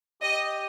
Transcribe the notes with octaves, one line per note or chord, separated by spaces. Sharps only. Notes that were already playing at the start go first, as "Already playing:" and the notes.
G4 D#5